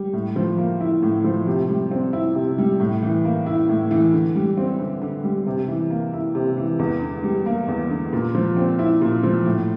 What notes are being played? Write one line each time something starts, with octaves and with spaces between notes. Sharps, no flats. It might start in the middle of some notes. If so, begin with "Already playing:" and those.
Already playing: G3
A2
F3
A#3
E4
A2
F3
C3
G3
C4
E4
C3
G3
A2
E3
A#3
E4
A2
E3
D3
G3
C4
D3
D3
G3
C3
E3
A#3
E4
C3
E3
E2
D3
G3
A#3
E2
D3
A#2
F3
C4
E4
A#2
F3
A2